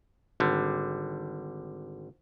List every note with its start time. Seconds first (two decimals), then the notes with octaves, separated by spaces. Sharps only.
0.40 G#1 D3 G3